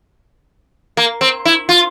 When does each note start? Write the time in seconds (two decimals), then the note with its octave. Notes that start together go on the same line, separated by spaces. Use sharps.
0.97 A#3
1.21 C4
1.45 E4
1.69 F4